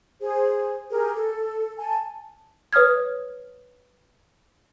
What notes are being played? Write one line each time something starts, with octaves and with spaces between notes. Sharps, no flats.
G#4 C5
G4 G#4 A#4
A4
G#5 A5
B4 C#5 D#6 F6 G#6